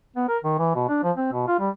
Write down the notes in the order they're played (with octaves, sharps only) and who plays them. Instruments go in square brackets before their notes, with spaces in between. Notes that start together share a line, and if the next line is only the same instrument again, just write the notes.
[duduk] B3
A#4
D#3
E3
B2
D4
F3
C4
B2
F4
G3